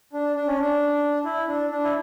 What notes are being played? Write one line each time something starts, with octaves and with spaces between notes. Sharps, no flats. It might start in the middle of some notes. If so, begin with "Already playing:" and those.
D4
D4
C#4
D4
E4
D4
D4
E4